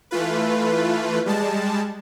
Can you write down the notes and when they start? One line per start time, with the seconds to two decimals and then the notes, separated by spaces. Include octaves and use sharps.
0.11 E3 A3 F4 B4
1.26 G3 G#3 A5